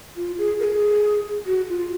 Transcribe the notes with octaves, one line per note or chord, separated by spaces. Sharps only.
F4
G#4
A#4
G#4
F#4
F4